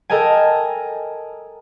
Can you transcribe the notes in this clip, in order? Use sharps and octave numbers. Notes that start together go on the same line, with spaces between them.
A4 A#4 D#5 G5 G#5